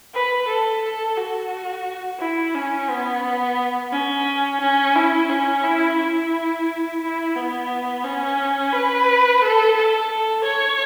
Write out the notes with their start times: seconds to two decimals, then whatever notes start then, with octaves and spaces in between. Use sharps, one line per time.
0.14 B4
0.48 A4
0.83 A4
1.17 F#4
2.20 E4
2.55 C#4
2.89 B3
3.92 C#4
4.61 C#4
4.96 E4
5.29 C#4
5.63 E4
5.98 E4
7.01 E4
7.36 B3
8.04 C#4
8.73 B4
9.42 A4
9.76 A4
10.44 C#5